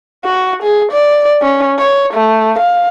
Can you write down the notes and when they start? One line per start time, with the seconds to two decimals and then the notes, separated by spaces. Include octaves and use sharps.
0.24 F#4
0.63 G#4
0.92 D5
1.42 C#4
1.79 C#5
2.14 A3
2.59 F5